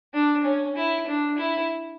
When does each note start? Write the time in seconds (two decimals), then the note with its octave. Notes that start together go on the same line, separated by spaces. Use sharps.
0.14 D4
0.44 C#4
0.76 E4
1.07 D4
1.38 E4